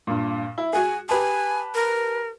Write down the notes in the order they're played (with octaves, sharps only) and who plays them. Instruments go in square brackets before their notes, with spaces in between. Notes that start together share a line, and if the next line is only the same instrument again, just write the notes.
[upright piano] G2 A#2
E4
[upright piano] F#4 G#4 [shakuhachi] G#5
[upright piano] G4 B4 A5 [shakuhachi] G#5
[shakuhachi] A#4